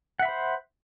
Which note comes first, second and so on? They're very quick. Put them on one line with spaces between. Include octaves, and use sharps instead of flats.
F#5 E5 B5 C5